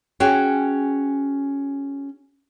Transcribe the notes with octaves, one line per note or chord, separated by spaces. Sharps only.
C#4 F#4 G#4 G5